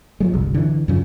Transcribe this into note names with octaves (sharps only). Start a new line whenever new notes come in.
F3 F#3 G#3
G1 C2
D3 E3
F#2 C#3 F3